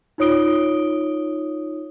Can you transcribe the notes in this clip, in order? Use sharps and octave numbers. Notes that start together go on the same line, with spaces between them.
D#4 F4 C#5 D#6 D7 G7